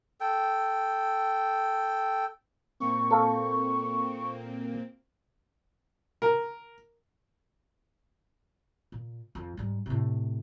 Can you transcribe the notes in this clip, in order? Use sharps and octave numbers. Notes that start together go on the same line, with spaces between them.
A4 G5
A#2 A#3 C4 C#6
A4 F5
A#4
A#2
F2
G#2 G3
A2 C3